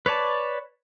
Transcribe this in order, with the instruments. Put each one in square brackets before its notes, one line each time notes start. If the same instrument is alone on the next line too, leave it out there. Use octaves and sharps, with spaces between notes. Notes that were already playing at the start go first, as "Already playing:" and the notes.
[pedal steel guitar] B4 C#5 D5 A5